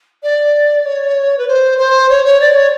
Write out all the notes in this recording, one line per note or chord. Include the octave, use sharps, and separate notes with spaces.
D5
C#5
B4
C5
C5
C#5
C#5
D5
C#5